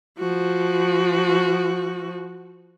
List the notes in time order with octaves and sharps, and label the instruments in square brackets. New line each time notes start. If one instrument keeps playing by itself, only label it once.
[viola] F3 F#4